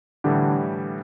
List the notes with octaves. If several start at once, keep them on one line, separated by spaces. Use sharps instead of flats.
A2 D3 E3 G3 D4 G4